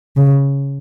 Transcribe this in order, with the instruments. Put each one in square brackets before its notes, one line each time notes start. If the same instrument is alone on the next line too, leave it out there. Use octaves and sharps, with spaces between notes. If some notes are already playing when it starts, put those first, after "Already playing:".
[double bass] C#3